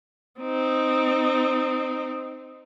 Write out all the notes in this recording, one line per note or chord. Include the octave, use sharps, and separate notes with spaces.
C4 D#4